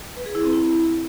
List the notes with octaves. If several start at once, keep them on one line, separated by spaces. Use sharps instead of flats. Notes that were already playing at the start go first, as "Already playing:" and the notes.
B4
G#4
E4
C4
E4